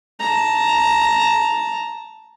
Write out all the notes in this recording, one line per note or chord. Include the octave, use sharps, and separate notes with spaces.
A5 A#5